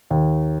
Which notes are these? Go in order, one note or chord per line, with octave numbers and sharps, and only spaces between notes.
D#2